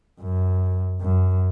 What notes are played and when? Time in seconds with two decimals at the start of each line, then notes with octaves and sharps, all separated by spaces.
0.20 F#2
1.01 F#2